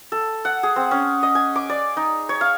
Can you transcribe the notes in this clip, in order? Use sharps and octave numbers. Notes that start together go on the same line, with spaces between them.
A4
F#5
G#4
C4
C#4
D#5
G#5
D6
D5
D#4
C#5
F5